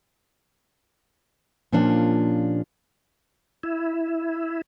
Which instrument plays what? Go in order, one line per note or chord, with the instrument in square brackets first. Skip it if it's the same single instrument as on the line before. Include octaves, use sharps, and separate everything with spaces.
[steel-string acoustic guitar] A#2 F3 A#3 C#4 D4 G4
[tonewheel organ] E4